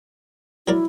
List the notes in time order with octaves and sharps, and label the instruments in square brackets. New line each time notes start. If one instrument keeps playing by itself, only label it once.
[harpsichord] F#3 A#4 D5 [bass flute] E4